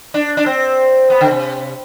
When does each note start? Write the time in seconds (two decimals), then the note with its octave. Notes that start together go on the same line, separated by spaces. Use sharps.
0.14 D4
0.37 D4
0.46 C4
1.10 B3
1.21 D3
1.31 C3